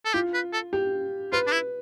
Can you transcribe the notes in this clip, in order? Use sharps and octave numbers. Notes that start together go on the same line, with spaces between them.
A4
F4 G4
B4
A4
G4
F4 B4
D4
E4